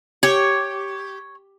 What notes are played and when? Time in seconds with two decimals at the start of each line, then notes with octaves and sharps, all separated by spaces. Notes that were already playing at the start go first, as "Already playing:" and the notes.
0.23 G4 C#5